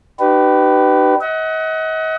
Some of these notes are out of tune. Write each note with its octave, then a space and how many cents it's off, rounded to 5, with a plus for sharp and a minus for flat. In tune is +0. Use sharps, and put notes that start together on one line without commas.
D#4 -45 G4 -30 B4 +15
D#5 +40 F#5 +15